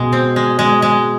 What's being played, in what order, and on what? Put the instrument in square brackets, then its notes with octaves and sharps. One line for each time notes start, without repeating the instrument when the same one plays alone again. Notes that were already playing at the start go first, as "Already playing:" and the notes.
Already playing: [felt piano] B2 [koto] G#3
[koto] C4
G#3
G#3
G#3